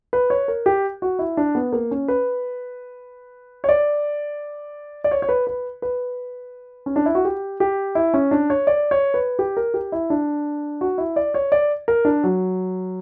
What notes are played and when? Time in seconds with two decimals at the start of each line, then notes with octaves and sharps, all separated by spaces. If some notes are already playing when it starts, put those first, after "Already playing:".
0.13 B4
0.30 C#5
0.48 A#4
0.66 G4
1.02 F#4
1.19 E4
1.37 D4
1.55 B3
1.73 A#3
1.91 C#4
2.08 B4
3.64 C#5
3.69 D5
5.04 D5
5.11 C#5
5.22 C#5
5.29 B4
5.47 B4
5.82 B4
6.86 C#4
6.96 D4
7.06 E4
7.15 F#4
7.25 G4
7.60 G4
7.95 E4
8.14 C#4
8.31 D4
8.50 C#5
8.67 D5
8.91 C#5
9.14 B4
9.39 G4
9.57 A#4
9.74 G4
9.92 E4
10.10 D4
10.81 F#4
10.98 E4
11.16 D5
11.34 C#5
11.52 D5
11.88 A#4
12.05 D4
12.24 F#3